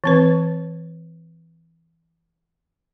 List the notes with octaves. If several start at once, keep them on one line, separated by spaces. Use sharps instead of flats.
E3 C4 B4